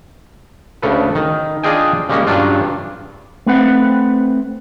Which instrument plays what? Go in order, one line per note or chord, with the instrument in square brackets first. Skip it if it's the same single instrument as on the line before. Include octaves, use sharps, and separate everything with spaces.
[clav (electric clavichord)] D2 C#3 A4 B4
D#3
D4 F4 G#4 D#5 G5 G#5
C#3 G3 G#3 A#3 C#4
G2 C#3 F#3 D4 F4
[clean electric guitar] A3 C4 B4 F#5